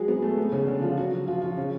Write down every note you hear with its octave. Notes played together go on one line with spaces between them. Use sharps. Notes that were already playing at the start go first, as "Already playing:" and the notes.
Already playing: F#3 G#3 F#4 G#4
B3
A3
B3
C#3 C#4
D3 D4
F3 F4
F#3 F#4
F3 F4
F3 F4
C#3 C#4